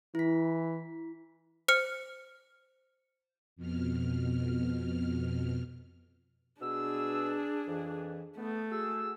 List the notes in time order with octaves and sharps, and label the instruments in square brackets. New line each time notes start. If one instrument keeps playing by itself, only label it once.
[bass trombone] E3 [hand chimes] E4 B6
[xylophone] C5 F6 C#7
[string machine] F2 B2 F6
[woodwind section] B2 E6 [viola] D4 G#4
[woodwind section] F2 E3
[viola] A3 [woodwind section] B3
[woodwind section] F#4 G#4 E6